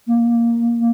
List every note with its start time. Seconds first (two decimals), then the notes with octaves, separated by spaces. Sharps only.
0.07 A#3